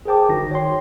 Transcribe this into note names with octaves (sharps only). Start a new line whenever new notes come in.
G#4 A#4 C5 G5 A5 D6
G1 D#3 D#4 F#4 A#6
C#5 G5 C6